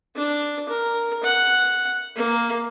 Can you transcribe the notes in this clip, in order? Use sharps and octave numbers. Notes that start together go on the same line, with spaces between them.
D4
A#4
F#5
A#3